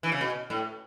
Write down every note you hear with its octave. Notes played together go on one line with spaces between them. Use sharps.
E3
C#3
B2
A2